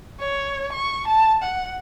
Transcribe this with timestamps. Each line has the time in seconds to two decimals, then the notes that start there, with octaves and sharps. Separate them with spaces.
0.19 C#5
0.73 C#6
1.08 A5
1.43 F#5